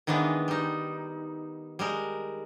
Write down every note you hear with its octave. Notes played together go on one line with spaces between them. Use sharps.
D#3 E3 G#3 B3 D4
G3 D#4
G3 G#3 A#4